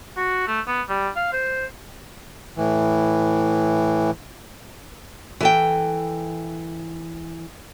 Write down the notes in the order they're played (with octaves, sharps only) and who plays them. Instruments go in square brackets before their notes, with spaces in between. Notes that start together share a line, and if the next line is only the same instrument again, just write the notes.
[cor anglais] F#4
A3
B3
G3
F5
C5
[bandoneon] A2 E3
[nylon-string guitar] E3 A4 G5